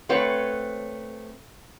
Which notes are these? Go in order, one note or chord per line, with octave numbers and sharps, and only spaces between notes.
A3 C4 B4 C#5 F#5